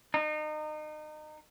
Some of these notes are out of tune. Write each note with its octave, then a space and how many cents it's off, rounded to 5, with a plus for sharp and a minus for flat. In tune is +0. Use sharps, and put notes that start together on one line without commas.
D#4 -30